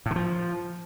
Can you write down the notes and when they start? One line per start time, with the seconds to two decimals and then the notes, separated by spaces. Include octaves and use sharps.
0.06 A2
0.11 D3
0.16 F3